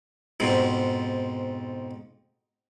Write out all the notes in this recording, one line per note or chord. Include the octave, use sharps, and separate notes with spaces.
F2 G#2 B2